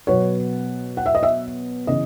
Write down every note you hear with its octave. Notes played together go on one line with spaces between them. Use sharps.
B2 F#3 B3 C#5
F#5
E5
D#5
E5
C#3 E3 D#5